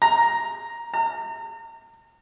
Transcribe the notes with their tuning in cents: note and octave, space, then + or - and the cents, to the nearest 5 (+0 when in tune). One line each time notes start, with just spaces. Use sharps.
A#5 +5
A#5 -35